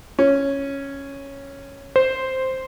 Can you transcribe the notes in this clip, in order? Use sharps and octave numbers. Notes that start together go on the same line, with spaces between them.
C#4
C5